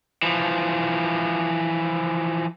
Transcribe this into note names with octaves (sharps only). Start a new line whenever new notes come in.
E3 F3